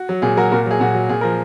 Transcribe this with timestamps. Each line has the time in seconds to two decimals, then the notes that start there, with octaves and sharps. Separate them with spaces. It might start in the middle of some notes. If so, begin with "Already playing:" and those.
Already playing: F#4
0.09 F#3
0.22 A#2 G#4
0.37 F#3 F#4 A#4
0.52 A#2 F#4 A#4
0.66 F#3 G#4
0.80 A#2 F#4
0.95 F#3
1.09 A#2 G#4
1.21 F3 A#4